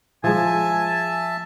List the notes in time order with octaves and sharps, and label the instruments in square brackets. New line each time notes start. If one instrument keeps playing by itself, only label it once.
[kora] F3 G#3 [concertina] E5 A5 [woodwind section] G#5